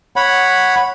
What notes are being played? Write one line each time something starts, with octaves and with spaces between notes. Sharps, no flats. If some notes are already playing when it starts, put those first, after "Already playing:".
C#5 F#5 B5